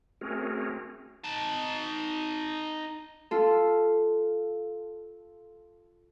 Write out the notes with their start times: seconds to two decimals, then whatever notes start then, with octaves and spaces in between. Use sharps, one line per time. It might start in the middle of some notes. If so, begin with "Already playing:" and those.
0.21 A3 C4 C#4 F#4 G#4 A#4
1.24 D#4 A5
3.31 F4 A4